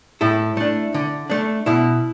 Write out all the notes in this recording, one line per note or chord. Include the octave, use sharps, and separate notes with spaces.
A2 E4 A4
A3 D4
D3
A3 D4
B2 E4